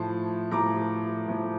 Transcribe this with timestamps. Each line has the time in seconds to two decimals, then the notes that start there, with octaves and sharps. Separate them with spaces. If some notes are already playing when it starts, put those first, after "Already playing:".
Already playing: A2 F3 A5 C6
0.51 A2 F3 A#5 D6
1.27 A2 F3